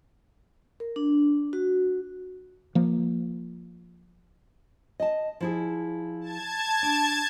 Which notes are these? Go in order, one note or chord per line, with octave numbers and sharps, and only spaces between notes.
A#4
D4
F#4
F3 A#3
D#5 A5
F3 E4 G#4
A5 G#6
D4